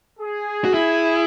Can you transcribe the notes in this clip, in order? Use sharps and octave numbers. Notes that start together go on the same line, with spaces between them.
G#4
F#4
E4